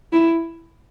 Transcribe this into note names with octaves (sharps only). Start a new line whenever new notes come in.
E4